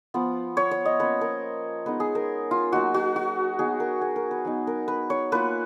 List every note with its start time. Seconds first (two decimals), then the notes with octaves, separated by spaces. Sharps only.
0.14 F3 B3 F4
0.57 C#5
0.71 C#5
0.85 D#5
1.00 A#3 C#4 F4 B4
1.21 A#4
1.86 G#3 B3 D#4 B4
2.00 G#4
2.15 A#4
2.51 F4
2.72 F#3 A#3 D#4 F#4
2.94 F#4
3.16 F#4
3.59 F#3 B3 D#4 G#4
3.80 A#4
4.01 G#4
4.16 A#4
4.31 B4
4.45 F#3 B3 D#4
4.67 A#4
4.88 B4
5.10 C#5
5.32 A#3 F4 B4